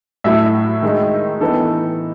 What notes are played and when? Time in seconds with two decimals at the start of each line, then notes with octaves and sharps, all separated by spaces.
0.24 A2 F#3 A3 E4 E5
0.82 D#3 G#3 D#4
1.41 E3 B3 D#4 A4